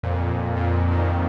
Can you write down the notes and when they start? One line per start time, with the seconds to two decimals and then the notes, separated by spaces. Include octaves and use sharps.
0.03 F2 A#2
0.56 F2 A#2
0.91 A#2 D#3